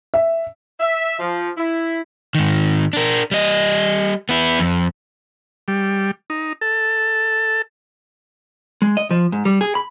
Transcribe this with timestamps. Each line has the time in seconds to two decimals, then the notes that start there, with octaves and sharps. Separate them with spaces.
0.14 E5
0.80 E5
1.19 F3
1.57 E4
2.35 G#2 D#3
2.93 D4 A#4
3.31 G3 D#5
4.29 B3 E4
4.59 F2
5.68 G3
6.30 D#4
6.61 A4
8.82 G#3
8.97 D#5
9.10 F3
9.32 G#2
9.45 G3
9.61 G#4
9.75 B5